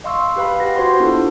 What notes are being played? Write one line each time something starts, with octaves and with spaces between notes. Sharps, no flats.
D#5 F5 C6 C#6 E6
G4 B4 F5 B5
G4 B4 F#5 A#6
F#4 C5 C6
B3 D4 E4 F4 A4